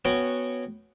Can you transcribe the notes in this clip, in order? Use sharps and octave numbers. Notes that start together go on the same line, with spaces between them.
B3 C#4 F#4 F#5 G5